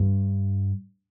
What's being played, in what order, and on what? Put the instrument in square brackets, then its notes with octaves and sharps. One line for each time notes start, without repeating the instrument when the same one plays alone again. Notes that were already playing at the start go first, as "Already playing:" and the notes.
Already playing: [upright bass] G2